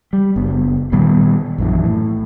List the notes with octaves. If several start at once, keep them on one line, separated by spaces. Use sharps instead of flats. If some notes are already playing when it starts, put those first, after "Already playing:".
G3
F#1 B3
A#2 D#3 G3 B3
A#1 F#2 E3
A2